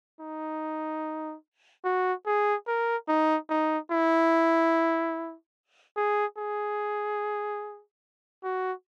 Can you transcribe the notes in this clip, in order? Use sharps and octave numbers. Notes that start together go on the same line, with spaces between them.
D#4
F#4
G#4
A#4
D#4
D#4
E4
G#4
G#4
F#4